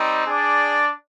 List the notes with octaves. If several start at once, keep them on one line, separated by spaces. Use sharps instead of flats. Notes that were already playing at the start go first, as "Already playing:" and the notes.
Already playing: G3 C4 D#4
D4 G#4 D5